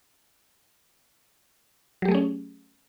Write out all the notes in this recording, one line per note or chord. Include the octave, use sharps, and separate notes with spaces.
F#3 A3 C#4 G4 G#4